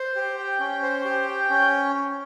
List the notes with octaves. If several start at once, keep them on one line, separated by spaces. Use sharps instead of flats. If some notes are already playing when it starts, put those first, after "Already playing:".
Already playing: C5
G4
G5
C#4
C5
G4
G5
C#4